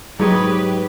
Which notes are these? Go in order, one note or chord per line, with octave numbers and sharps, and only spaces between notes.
G#2 F#3 G4 B4 C#5 D#5